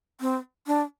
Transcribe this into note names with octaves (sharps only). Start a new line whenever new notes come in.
C4
D4